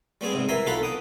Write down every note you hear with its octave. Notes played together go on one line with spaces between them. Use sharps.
G3 B3 C4 G#4
G#2 C3
E3 A#4 E5 G#5 C6
B1 F4 A4 F5 F#5 B5
G5 D#6